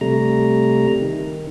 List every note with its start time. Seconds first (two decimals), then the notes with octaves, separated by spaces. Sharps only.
0.01 C3 G3 A3 A#5
1.02 D#3